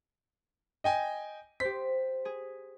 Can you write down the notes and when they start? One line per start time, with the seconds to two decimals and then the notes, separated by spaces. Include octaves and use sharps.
0.84 D#5 G5 G#5
1.60 G4 C5 B6
2.25 G#4